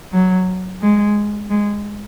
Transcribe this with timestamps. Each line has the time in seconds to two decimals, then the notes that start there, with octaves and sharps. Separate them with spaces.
0.13 F#3
0.82 G#3
1.50 G#3